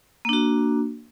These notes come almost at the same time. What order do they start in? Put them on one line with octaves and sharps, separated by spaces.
A#3 D4 F#4